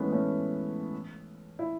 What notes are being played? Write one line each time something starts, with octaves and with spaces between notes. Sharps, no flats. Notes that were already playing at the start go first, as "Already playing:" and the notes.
Already playing: E3 G#3 A3 B3 C#4
A3 C#4
E4